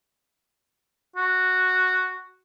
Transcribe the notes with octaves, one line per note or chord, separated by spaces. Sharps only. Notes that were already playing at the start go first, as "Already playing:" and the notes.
F#4